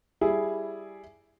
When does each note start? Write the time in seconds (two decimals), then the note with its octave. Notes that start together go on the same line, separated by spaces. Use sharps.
0.21 G3 E4 G#4